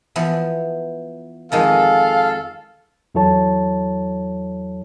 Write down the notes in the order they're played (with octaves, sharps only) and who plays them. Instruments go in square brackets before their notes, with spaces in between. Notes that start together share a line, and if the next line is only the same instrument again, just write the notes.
[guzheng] E3 F3 B3
[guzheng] F2 D#3 G#3 [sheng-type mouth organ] A4 [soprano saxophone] F5
[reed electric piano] E2 F#3 E4 A4 C#5 A5